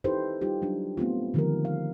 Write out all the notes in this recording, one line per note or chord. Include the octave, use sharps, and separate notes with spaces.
D#4 E4 G4 A4 B4 C5
G3 D#4 F4 G4
F#3 G3 D4
A3 B3 C4 F4
D3 D#3 F3 G#3 G4 A#4
F5